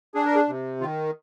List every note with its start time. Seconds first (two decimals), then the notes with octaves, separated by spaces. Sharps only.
0.15 D4 G#4
0.26 A#4
0.36 G#4
0.48 C3
0.81 D#3 F4